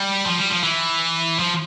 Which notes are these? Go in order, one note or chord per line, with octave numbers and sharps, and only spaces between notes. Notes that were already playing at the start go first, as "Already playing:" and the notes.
Already playing: G3
F3
G3
F3
E3
F3